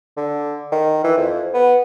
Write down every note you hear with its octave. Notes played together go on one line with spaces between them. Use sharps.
D3
D#3
E3
F2
B3